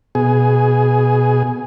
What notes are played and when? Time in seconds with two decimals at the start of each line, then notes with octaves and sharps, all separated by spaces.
0.15 B2 G#4